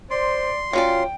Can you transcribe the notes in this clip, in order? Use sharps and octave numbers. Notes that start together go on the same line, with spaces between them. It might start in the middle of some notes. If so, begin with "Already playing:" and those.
C5 D5 C6
F#3 C#4 F4 D5 G5